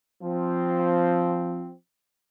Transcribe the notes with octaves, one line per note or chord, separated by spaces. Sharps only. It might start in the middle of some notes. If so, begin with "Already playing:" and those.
F3 C4